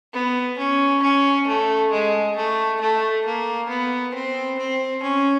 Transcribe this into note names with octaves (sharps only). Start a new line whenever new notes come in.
B3
C#4
C#4
A3
G#3
A3
A3
A#3
B3
C4
C4
C#4